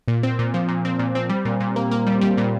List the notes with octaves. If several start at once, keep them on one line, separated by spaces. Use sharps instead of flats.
A#2
C4
A#2
F3
A#2
C4
A#2
C4
G3
A#2
A#2
A#3
A#3
G3
G3
A#2